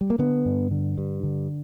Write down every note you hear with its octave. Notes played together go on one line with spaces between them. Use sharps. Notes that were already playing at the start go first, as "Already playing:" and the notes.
G3
A#3
D3 B3
G2
D3
G2
D3